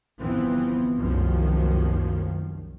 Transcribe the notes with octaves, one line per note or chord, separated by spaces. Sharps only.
G1 F2 E3 F3 B3 C4
F1 C2 F#2 D#3 F3 A#3